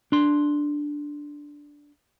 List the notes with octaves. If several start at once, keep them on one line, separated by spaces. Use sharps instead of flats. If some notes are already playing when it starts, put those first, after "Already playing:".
D4 C6